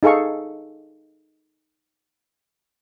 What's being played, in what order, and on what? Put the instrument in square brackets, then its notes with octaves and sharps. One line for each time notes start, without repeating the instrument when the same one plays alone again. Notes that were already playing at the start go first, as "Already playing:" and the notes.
[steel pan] D#4 G#4 A4 F5 C#6